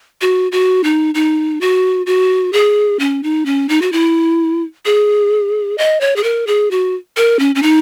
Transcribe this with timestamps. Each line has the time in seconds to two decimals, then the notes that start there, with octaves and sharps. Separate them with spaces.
0.21 F#4
0.52 F#4
0.84 D#4
1.15 D#4
1.61 F#4
2.06 F#4
2.53 G#4
2.99 C#4
3.23 D#4
3.46 C#4
3.69 D#4
3.82 F#4
3.92 E4
4.85 G#4
5.78 D#5
6.01 C#5
6.16 G#4
6.23 A#4
6.47 G#4
6.71 F#4
7.17 A#4
7.39 C#4
7.55 C#4
7.63 D#4